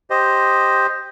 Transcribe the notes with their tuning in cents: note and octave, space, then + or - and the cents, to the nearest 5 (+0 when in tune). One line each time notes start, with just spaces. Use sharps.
G4 +0 C5 +0 D#5 +0